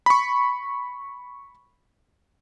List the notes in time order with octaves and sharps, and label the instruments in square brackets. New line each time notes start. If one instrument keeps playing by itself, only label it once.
[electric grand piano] B5 C#6